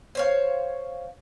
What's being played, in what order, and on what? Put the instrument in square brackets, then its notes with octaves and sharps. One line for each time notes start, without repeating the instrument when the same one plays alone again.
[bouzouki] C5 C#5 F5